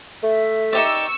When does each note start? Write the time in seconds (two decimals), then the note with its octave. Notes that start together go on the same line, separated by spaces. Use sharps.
0.23 A3 E5
0.73 D#4 G4 D5 C#6 E6 C#7